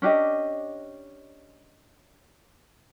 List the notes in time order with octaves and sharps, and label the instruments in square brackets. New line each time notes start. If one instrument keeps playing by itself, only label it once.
[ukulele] C#4 D4 G4 D#5